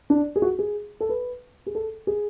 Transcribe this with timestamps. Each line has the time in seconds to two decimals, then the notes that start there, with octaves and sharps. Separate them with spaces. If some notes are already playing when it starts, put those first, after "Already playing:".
0.10 D4
0.36 G#4
0.42 F#4
0.59 G#4
1.00 A4
1.09 B4
1.66 G#4
1.75 A4
2.07 G#4